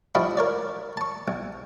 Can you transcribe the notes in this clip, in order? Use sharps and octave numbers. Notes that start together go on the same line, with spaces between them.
F3 G3 D4 E4 F#4 D#5
A#4 C#5 D5
A5 C#6
B1